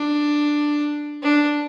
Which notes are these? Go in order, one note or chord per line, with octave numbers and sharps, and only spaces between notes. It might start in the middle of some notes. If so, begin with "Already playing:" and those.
Already playing: D4
D4